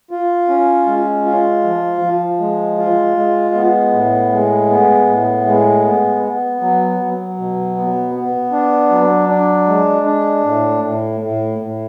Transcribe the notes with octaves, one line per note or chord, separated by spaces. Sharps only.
F4
C#4
G#3
F4
F3
F3
G#3
F4
G#3
B3
A2
G#3
B3
A2
G#3
B3
B3
F#3
F#3
B2
B3
B3
D4
F#3
D4
G#3
D4
A2
A2
A2
A2